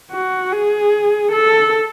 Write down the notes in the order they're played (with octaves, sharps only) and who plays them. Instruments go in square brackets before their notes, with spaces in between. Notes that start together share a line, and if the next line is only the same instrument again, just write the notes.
[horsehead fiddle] F#4
G#4
A4